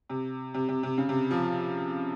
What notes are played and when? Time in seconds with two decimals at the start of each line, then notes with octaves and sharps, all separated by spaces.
0.10 C3
0.54 C3
0.69 C3
0.83 C3
0.98 C#3
1.09 C3
1.31 F3